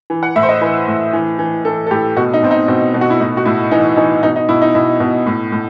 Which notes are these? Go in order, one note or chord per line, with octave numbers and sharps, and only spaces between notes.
E3
F#5
A2 E5
C5
D#5
E3 B4
A2
E3
E3
E3 A4
A4
A2 G4
B2 F#4
D#4
B2 C4
D#4
B2 C4
B2
F#4
E4
A2 D#4
F#4
A2 E4
E3 D#4
E3 D#4
B2 D#4
D#4
B2 E4
D#4
B2 E4
B2
A2
A2